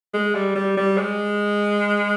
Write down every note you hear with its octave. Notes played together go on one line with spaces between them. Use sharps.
G#3
G3
G3
G3
G#3